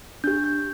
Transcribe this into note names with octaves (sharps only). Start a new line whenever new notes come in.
D4 G4 G6
G6